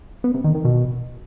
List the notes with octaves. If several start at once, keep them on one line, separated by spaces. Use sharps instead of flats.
B3
C3
D#3
D#3
B2